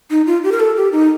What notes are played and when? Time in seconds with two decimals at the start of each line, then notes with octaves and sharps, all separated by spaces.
0.10 D#4
0.26 F4
0.43 G4
0.52 A#4
0.60 A4
0.77 G4
0.92 D#4